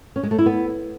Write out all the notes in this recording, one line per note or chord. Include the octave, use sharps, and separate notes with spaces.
C#4
G#3
A3
E4
B3